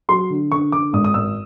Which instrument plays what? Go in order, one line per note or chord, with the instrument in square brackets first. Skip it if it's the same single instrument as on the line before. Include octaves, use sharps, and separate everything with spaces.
[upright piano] F#3 [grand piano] C6
[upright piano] D3
[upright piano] D3 [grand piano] C#6
[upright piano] D3 [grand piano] D6
[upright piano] G#1 [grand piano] D#6
[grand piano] D#6
[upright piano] G#1 [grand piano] E6